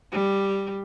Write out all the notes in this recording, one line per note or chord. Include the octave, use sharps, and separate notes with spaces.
G3